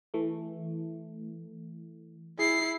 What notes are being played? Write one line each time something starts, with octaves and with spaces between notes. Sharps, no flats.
E3 A3
E4 G#4 C7